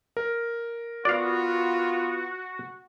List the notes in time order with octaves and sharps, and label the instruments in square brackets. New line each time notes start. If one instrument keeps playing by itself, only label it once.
[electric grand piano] A#4
[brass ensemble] B3 F4 [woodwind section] F#4 [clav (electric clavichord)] D5 F5